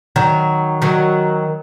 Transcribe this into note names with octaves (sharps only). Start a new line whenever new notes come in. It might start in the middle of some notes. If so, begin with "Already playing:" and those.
D#3 F#3
D#3 F#3